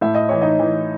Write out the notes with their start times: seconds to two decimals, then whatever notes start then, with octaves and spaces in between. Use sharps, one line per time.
0.01 A2 E5
0.15 D#5
0.29 E3 C#5
0.42 D#4 D#5
0.60 E3